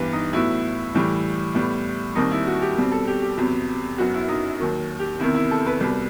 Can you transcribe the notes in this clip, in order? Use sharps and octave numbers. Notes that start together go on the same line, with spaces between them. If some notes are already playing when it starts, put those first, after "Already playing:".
Already playing: G2 E3 B3 G4 B4
D#4
A2 F#3 B3 E4
A2 E3 G3
A2 G3 B3
D#2 D#3 G3 C4 D#4
E4
F#4
G4
B2 G3 C4
A4
G4
G4
E2 C3 F#3 B3
F#2 F#3 B3 F#4
E4
D#4
D#2 D#3 F#3
G4
E2 C3 D#3 E4
E4
A4
B4
C2 B2 G3